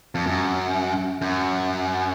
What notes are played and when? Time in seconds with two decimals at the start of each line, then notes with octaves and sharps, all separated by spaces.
0.15 F2
0.27 F#2
1.22 F#2